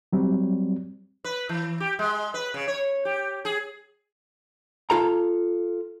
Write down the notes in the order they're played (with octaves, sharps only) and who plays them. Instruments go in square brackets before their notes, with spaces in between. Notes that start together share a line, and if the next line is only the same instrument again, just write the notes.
[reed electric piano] F#3 G3 C4
[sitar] B4
E3
G4
G#3
B4
C#3
C#5
G4
G#4
[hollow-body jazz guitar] F4 A4 A#5